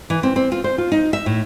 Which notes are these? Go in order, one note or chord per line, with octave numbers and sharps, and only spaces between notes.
E3
C4
C4
F4
C5
F4
D#4
E5
A2